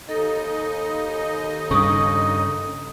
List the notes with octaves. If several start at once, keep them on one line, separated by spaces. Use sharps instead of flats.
D#2 D#4 A4 D#5
G2 C#3 C#6 D#6